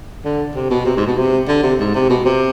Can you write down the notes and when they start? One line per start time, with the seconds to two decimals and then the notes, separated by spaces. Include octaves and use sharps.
0.25 D3
0.55 C3
0.70 B2
0.85 C3
0.97 G#2
1.07 B2
1.17 C3
1.48 D3
1.63 C3
1.79 G#2
1.94 C3
2.09 B2
2.25 C3